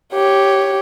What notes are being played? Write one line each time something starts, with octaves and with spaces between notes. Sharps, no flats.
G4 C#5